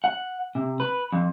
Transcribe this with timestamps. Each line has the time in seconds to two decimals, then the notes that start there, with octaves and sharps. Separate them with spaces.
0.04 F#5
0.55 C3
0.80 B4
1.13 F2